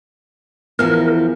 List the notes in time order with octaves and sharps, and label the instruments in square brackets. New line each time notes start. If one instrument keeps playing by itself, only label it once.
[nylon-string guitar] E2 F3 [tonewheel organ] A#4